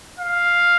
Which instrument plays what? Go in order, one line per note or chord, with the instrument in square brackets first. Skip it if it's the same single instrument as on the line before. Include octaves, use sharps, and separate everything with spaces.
[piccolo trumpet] F5